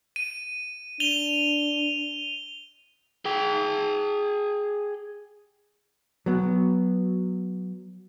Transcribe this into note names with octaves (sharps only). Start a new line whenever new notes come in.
D#7
D4 D#7 F7 G7
G#4 G5
F#3 B3